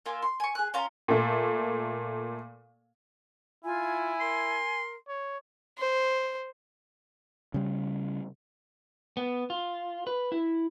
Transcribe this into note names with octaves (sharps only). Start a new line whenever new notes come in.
A#3 F4 E5 G#5
C6
G#5 C#6
G#4 F#6
C#4 F4 F5 A#5
A#2 A3
E4 F4 G#5
A#4 C6
C#5
C5
C#3 G3
B3
F4
B4
E4